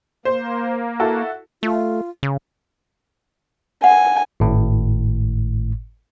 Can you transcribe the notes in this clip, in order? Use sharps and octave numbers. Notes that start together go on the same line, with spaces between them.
A#3 C5
E4 F#4 A4
A3 F4
C#3
F#5 G#5
G#1 A2